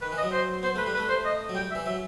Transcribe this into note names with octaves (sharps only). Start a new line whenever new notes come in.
D#3 B4
E3
D#5
F#3
C5
B3 C5
A3 B4
G3
B4
A3
C5
D#5
F#3
G3 G5
E5
E3
F#3 E5